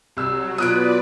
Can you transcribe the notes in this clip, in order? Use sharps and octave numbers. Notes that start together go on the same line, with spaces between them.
C2 F#3 E6
B2 F#3 F4 B4 D5 D#6 F#6 D7